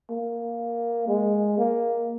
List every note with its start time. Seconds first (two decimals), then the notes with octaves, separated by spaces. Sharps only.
0.10 A#3
1.08 G#3
1.58 A#3